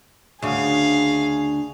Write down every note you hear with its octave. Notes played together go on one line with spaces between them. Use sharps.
D2 C#3 G#4 F5